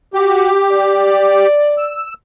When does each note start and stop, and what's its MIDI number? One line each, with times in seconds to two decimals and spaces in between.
0.14 0.51 66
0.14 1.47 67
0.71 2.04 74
1.78 2.14 88